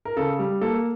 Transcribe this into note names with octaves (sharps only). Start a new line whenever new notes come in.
A#4
C#3 A4
G3
A#3 A4